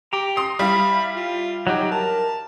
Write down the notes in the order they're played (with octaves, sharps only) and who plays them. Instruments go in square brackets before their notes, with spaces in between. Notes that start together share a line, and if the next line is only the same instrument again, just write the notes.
[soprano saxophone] G4 [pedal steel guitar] A#5 D6
[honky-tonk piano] C6 D#6 C7
[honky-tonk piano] G3 E4 F5 [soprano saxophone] B5
[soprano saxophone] F4
[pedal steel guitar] F#3 G4 [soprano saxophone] D#4
[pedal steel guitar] A#4 [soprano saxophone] A5